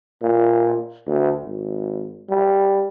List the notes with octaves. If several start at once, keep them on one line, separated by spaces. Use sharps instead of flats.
A#2
D2
G#1
G3